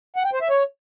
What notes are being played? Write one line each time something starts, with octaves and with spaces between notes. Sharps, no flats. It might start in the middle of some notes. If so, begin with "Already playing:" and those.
F#5
G5
C5
E5
C#5